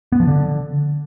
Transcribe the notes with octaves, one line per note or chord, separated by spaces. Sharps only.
B3
F3
D3